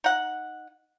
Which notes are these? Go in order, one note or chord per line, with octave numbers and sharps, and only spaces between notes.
D#4 F#5